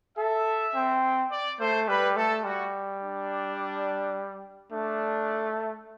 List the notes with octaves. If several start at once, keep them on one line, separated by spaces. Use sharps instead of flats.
A4 E5
C4
D5
A3 C5
G3 B4
A3 A4
G3 F#4
D4
A3 D4